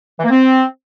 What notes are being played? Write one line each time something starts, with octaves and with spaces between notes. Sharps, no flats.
E3
A#3
C4